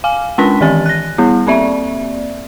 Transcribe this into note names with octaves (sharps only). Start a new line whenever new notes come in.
F5 G#5
G#3 C#4 D4 A5 B6
D#3 E3 G4 G#5 A6
F#6 A#6
G3 B3 E4
A#3 C4 D5 E5